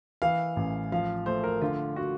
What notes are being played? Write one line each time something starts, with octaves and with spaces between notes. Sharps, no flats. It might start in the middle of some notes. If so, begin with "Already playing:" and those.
E3 F5
A1
F3 F5
A3 C5
A#4
D3 F4
F#4